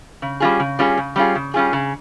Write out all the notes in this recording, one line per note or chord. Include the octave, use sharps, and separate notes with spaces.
C#3
G3 C#4 F4 G#4
C#3
G3 C#4 F4 G#4
C#3
G3 C#4 F4 G#4
C#3
G3 C#4 F4 G#4
C#3